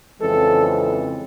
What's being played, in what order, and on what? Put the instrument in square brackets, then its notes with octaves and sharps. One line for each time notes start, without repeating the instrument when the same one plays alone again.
[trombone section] F2 C#3 E3 G#3 C4 A4